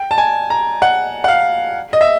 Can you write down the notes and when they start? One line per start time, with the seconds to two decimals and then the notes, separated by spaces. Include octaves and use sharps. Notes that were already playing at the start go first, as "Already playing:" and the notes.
Already playing: G5
0.11 A5
0.18 G#5
0.50 A#5
0.82 F#5
1.24 F#5
1.28 F5
1.93 D#5
2.01 E5